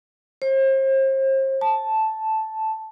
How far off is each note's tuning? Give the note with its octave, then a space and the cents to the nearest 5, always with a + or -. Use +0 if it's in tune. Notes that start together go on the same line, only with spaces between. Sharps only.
C5 +40
A5 -5